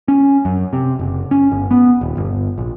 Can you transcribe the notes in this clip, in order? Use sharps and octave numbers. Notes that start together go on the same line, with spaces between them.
C#4
F#2
C3
F#1
C#4
G1
B3
D#1
G1
A#1